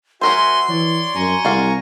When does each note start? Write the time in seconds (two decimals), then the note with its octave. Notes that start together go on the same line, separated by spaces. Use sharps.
0.21 F#3 F#4 A#4 C5 E5 G#5 C6
0.69 E3 C#5 D5
1.15 F#2 G#5 A#5 C#6
1.45 C2 F#4 D5 F5